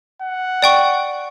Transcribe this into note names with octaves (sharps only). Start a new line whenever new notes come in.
F#5
D5 G5 C#6